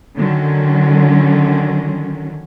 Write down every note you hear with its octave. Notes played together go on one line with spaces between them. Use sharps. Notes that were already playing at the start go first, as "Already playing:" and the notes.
D3 D#3 F#3 C#4